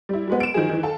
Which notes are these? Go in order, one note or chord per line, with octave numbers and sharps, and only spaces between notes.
G3 E4
F#3 G#3 B3
D7 E7
D#3 F3 F#3 G#4
D#3 E3
A4 F5 A5